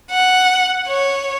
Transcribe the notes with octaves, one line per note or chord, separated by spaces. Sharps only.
F#5
C#5